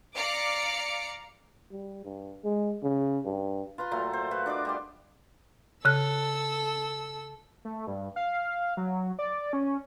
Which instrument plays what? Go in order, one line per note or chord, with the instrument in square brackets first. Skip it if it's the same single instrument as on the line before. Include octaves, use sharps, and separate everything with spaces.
[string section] D5 F5 A#5 D6 C#7
[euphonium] G3
G2
G#3
C#3
G2
[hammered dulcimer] F4 B4 A#5 C6
A#2 F#3 A3 A#5
C5
F4 F#4 B4
D4 D5 D#5 D6
G3 G4 C6
[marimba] C#3 F#6 [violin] A4 E6
[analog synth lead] A3
G2
F5
F#3
D5
C#4